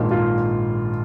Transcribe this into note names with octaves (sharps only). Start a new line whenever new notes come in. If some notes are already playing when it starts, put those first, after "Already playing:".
Already playing: A#1 G#2 D#3 D#4 F4
F4